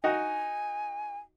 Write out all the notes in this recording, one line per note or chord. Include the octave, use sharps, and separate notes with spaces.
D#4 F#4 G#5